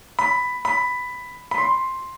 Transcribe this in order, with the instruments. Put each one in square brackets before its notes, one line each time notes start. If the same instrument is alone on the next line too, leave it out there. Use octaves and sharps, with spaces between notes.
[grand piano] B5
B5
B5
C6